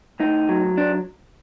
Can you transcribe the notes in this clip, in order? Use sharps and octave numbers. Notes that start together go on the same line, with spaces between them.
A2 D#4
F#3
D4